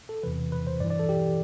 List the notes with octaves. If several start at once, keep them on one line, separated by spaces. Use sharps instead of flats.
A4
E2 C3 E3 B4
B4
C5
G2 E3 D5
D5
A4
G4